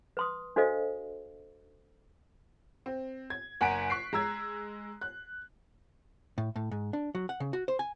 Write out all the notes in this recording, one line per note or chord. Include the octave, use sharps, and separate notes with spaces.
B4 C6 D#6
D4 F#4 A4 C5 D#5 F5
C4
G#6
F#1 F#5 G#5 A#5 B6 D7
C#6 F#6 B6 C7 D7
G#3 A#5 E6 G#6
F#6
A2
A2
G#2
D4
F#3
F#5
C#3
F#4
C5
G#5